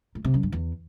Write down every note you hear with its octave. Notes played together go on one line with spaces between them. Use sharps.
A2
C3
F#2
G2
E2